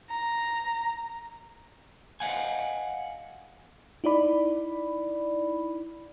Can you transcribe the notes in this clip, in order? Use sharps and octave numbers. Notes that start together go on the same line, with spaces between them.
A#5
D#5 F5 F#5 G#5
D#4 E4 D5 B5